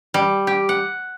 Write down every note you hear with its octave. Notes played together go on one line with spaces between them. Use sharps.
G3
G4
F#5